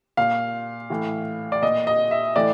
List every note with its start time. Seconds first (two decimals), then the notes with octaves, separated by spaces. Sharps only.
0.17 A#2 F5
0.90 A2 E3
1.52 D5
1.62 A#2 D#5
1.87 D#5
2.11 E5
2.36 A2 E3 D5